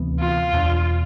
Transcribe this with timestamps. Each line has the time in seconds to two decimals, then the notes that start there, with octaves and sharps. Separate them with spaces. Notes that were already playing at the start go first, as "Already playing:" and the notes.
Already playing: D2 C3 E3 B3
0.19 F4
0.53 E2 B2 A3 D4